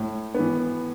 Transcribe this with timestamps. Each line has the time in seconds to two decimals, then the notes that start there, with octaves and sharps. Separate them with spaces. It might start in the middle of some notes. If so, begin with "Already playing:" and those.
Already playing: A2
0.34 E3 B3